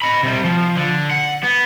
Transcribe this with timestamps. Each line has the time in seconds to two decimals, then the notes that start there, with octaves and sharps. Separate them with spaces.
0.02 D#5 B5
0.23 C3 G3
0.44 F3
0.77 D3
1.11 F#5
1.44 B3